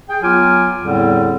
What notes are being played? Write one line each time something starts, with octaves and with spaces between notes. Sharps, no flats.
G#4 G5
F#3 B3 F4 G#5 D6 F6
E2 A2 D3 G3 C4